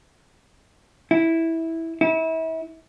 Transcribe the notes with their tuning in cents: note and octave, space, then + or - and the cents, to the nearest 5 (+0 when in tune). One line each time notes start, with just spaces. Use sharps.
E4 -10
E4 -35